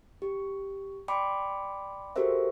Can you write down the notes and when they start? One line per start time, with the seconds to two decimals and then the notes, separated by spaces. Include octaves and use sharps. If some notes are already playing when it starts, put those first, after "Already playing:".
0.22 G4
1.08 D5 G5 B5 C6 D6
2.16 F#4 G4 A4 A#4 C5 E5